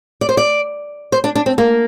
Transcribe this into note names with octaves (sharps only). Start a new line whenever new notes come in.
D5
C5
D5
C5
D4
D4
C4
A#3